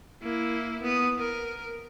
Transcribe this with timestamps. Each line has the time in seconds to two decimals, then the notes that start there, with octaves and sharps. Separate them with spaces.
0.22 A#3 E4
0.82 B3 D#6
1.19 A#4